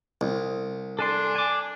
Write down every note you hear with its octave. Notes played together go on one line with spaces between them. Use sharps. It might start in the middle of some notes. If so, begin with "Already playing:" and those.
C2
D4 A4 G#5 C6
G#5 D6